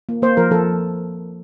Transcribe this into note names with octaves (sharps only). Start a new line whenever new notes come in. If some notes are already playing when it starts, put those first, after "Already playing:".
A#3
A#3 C5
F3 A#4
F3 A4